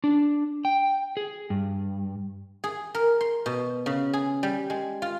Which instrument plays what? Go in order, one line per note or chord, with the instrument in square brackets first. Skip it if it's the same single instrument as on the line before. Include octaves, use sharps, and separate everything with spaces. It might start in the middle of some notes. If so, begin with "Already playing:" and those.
[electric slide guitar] D4
G5
G#4
G2
[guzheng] G#4
A#4
C6
B2
C#3
G#4
G3
G#3
F4